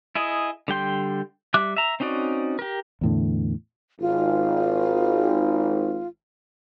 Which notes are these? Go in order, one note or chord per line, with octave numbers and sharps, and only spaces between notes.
E4 G#4 D#5
D3 G3 G5 C6
G3 E5 D6 F#6
E5 A#5
C4 C#4 D#4 F#4 D5
G4 A#4
E2 A2 D3
G#1 F4